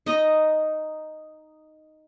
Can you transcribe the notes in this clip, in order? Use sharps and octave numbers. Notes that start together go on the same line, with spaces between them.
D#4 D#5